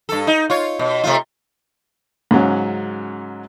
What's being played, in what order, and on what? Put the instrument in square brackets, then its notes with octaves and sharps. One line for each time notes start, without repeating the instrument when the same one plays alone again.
[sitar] G2 A4
D#4
F4 C#5
B2
C3 A3 F4
[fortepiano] G#2 C#3 F#3 C#4